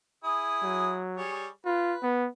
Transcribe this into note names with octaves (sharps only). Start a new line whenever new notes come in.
E4 G#4 D#6
F#3
G3 G#4 C#5
F4 B4
B3